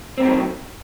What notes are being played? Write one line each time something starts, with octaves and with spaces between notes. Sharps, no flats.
A2 C3 D#3 F#3 C4